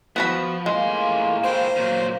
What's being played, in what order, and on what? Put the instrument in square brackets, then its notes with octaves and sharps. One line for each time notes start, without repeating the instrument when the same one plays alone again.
[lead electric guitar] F3 [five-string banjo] B3 F#4 B5
[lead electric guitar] A2 C6 [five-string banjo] G#3 [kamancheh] A#3 F4
[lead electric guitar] E4 G5 [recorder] C5
[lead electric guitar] A#2 F#3